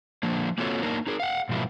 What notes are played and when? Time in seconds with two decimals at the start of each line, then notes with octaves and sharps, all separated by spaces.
0.23 D3 F3 A#3 D4
0.58 A#3 C4 F4 F#4 A4 C#5
0.83 A#3 D4 D#4 A#4
1.07 D#4 G#4 A#4
1.20 F5 F#5
1.49 G#2 B2 F3 G3 A#3 E4